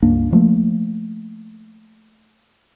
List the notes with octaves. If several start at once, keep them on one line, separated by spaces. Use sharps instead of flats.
C#2 G2 A#3 D4
D2 F3 A3 A#3